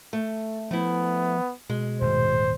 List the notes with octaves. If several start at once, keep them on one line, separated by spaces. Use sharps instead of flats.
A3
F3 A3 B3 E4
B2 G#3
D#1 G#2 C5